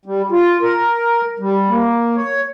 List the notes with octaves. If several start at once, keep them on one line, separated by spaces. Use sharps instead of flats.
G3
F4
A#4
G3
A#3
C#5